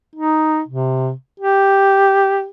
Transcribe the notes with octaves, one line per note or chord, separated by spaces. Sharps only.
D#4
C3
G4